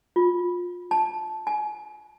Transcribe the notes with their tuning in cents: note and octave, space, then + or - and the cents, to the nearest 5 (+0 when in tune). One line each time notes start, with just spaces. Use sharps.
F4 +25
A5 -10
G#5 +30